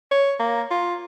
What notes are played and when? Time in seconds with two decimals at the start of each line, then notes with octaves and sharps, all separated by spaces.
0.11 C#5
0.39 A#3
0.71 F4